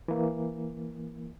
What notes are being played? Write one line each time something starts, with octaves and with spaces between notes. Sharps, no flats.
E3 A#3